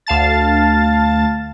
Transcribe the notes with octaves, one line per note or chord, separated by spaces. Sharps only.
D2 F5 A5 A6